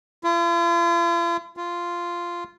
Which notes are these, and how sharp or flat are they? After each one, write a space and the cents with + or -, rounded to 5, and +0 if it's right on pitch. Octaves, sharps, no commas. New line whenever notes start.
F4 -45
F4 -10